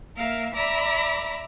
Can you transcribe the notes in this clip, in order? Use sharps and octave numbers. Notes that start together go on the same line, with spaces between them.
A#3 A#4 E5 F5
D5 E5 A#5 B5 D6